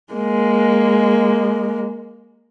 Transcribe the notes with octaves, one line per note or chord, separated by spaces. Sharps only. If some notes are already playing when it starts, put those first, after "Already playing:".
G#3 A#3